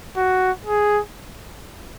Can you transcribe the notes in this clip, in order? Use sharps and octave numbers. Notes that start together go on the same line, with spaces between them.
F#4
G#4